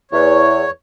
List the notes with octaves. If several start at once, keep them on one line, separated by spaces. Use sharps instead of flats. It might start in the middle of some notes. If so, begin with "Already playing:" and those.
E2 C#5